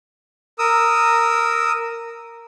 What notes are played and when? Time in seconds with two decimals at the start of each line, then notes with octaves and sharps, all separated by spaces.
0.59 A#4 D#6 E6